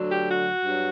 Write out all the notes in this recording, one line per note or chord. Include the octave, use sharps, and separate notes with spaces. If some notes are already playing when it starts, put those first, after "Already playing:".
Already playing: D2 D3 F#3
G4
F#4
G2 F#3